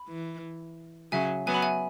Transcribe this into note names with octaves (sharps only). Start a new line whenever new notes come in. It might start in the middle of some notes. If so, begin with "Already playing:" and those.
Already playing: B5
E3
C#3 F#3 E5 G#5
F#3 B3 G#5
B5
E5 G#5